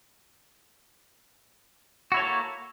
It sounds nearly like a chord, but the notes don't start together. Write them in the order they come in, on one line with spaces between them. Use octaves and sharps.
F#4 E4 C#5 A4 A#3